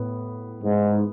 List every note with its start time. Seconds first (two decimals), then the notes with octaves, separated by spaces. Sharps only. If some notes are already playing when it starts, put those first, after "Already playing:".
Already playing: A2 B3
0.63 G#2